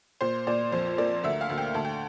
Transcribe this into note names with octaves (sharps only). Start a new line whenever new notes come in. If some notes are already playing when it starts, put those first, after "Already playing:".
A#2 C5
A#2 D5
F2 C5
A#3 D5
D2 E5
F5
D2
G5
D2 A5
G5